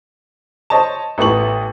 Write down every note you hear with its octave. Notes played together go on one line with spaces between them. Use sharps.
C5 C#5 D#5 A5
A1 A3 B3 C#6 F#7